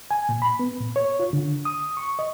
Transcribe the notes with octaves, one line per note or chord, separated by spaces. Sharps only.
G#5
A#2
B5
B3
A#2
C#5
F4
D3
D#6
C#6
D#5